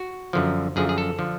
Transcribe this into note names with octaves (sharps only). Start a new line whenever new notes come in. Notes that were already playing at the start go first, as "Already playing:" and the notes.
Already playing: F#4
F#2 D3 F3
F#2 D3 F3 G#4
G#4
A4
D3 F3